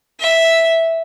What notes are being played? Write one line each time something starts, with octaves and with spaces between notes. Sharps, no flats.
E5